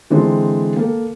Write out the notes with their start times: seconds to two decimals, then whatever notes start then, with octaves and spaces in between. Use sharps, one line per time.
0.10 D3 E3 G#3 C4 D4 C5
0.76 A#3 A4